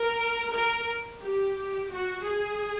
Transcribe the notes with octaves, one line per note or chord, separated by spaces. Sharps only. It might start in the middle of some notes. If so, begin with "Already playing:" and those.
Already playing: A#4
A#4
G4
F#4
G#4